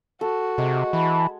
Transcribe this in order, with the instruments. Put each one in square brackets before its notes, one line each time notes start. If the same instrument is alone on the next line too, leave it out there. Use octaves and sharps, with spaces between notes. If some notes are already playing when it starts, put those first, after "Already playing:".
[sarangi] F#4 [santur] A4
[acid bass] C3 [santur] G#3
[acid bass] E3 [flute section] A5 B5